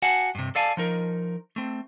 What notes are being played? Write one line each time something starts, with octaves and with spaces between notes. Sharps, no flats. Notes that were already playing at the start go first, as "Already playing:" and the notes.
F#4 F5 F#5 G#5 A5
G2 C3
A4 D5 F5 G#5 A5
F3 D#4 A#4
A3 C4